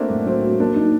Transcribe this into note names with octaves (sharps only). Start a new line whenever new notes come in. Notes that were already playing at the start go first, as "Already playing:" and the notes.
Already playing: A3 A#3 C4 D4 F#4
A2
F#3 C4
F#3
A#3 D4
D#4